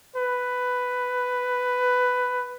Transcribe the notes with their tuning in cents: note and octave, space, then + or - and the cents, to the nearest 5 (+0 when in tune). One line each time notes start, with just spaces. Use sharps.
B4 +10